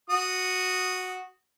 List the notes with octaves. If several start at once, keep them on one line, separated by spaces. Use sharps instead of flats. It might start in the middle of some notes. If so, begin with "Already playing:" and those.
F#4 D#6